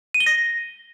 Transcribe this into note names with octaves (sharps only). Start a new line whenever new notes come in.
D#7
G7
A#6